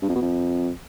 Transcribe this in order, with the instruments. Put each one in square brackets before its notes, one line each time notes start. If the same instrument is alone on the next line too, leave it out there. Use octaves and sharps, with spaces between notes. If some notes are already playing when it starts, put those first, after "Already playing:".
[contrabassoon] G2
F2
B2
F2